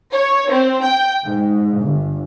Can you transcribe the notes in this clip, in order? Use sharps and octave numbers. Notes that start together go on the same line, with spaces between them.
C#5
C4
G5
G#2
G1